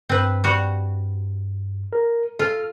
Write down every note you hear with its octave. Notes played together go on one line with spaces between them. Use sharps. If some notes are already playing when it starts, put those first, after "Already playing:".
G2 C4 B4
G3 F#4
A#4
F4 A4 F6